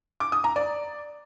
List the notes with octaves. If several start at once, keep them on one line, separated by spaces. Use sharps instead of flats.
D6
D#6
A#5
D5